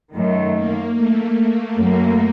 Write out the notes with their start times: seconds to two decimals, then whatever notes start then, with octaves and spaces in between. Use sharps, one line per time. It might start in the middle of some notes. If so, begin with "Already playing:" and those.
0.13 F#2 D#3 A3
0.54 A#3
0.95 A3
1.77 F#2 F#3 A#3